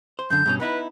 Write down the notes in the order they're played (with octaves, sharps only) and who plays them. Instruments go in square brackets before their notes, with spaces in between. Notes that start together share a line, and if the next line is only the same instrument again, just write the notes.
[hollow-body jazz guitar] C5
[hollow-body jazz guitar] F#2 D3 [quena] G6
[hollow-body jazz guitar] G2 B2 C#4
[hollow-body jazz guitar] B3 D#4 E4 [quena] B4